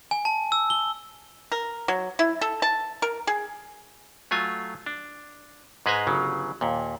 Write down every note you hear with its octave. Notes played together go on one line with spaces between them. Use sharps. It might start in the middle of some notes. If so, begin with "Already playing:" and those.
G#5
A5
E6
G7
A#4
F#3
E4
A4
A5
A#4
G#4
F#3 A3 F4 G#5
D4
G#2 G#3 B4 C5 G#5 A#5
G1 C#3 F#3
D#2 A#2